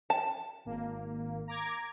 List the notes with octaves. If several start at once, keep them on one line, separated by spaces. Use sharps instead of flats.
A5
G#1 A#3
A#5 D6 G#6